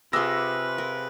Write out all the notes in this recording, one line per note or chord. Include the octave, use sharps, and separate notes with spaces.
C3 F4 G#4 B4 C6 D6 E6 A#6
A#4